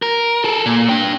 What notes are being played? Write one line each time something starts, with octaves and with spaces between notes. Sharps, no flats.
A#4
G#4 A4
A#2
D4 G5